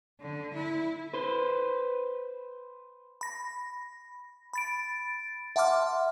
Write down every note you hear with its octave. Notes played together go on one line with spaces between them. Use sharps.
D3
E4
B4 C5
B5 A#6
B5 A6 D7
E5 F#5 A5 C6 D6 F6